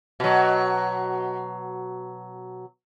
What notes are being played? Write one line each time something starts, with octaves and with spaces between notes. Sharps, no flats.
B2 F#3